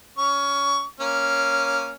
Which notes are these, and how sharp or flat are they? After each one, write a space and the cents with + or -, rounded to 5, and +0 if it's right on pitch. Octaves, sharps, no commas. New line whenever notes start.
C#4 +20 C#6 +20
A#3 +0 C#4 +0